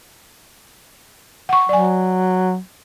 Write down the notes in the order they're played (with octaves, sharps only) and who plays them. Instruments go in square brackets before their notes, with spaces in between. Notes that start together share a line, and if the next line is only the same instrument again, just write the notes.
[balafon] F#5 C#6
[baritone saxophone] F#3 [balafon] D5 G#5